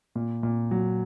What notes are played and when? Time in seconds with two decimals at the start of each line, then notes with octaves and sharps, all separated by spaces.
0.15 A#2
0.43 A#2
0.71 F#3